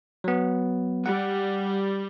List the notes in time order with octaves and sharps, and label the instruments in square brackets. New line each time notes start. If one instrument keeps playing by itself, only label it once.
[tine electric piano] F#3 B3
[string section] G3 [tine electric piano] F#5